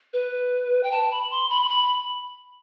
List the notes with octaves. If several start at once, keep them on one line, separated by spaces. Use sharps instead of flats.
B4
G5
A5
B5
C6
B5
C6
B5